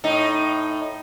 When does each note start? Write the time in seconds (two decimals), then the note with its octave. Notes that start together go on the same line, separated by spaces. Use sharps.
0.04 A2 D#4